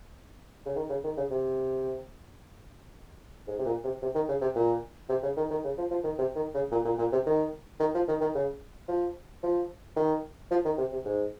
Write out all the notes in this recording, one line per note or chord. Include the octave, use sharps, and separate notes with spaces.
C#3
D#3
C#3
D#3
C#3
C3
G#2
C3
A#2
C3
C3
D#3
C#3
C3
A#2
C3
C#3
D#3
D#3
C#3
F3
F3
D#3
C3
D#3
C#3
A#2
A#2
A#2
C3
D#3
D#3
F3
D#3
D#3
C#3
F3
F3
D#3
F3
D#3
C3
C3
G#2